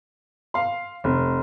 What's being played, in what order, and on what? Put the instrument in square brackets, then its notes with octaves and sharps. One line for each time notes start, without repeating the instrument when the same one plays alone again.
[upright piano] F5 C6
F1